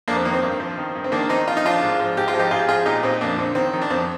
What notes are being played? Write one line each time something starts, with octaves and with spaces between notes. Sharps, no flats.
F2 A#3 D4
C4
D#3 A#3
C4
G2
F3
D#3
G2
C4
D#3 A#3 D4
D#3 C4 D#4
F3 F4
D#4
F3 D4 F4
G#2
F3
G#2 G4
F4
F3
D#4 G4
G#2 F4 G#4
F3 F4 G#4
A#2 D#4 G4
A#2 C4 D#4
F2 A#3 D4
D3 C4
D#3 C4
D#3
D4
F2 C4